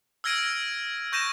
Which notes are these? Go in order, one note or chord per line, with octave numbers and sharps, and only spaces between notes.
E6 F6 G#6 A#6 D7 D#7
C#6 G6 A#6 D#7 E7